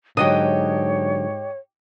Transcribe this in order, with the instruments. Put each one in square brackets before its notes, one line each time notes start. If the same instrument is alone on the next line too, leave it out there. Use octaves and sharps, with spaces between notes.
[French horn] G#2 [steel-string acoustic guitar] D3 F#3 [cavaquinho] G4 D#5 D#6 [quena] C#5